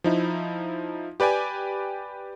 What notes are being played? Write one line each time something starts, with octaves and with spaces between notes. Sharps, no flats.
F3 D#4 E4
G4 B4 D5 G5 G#5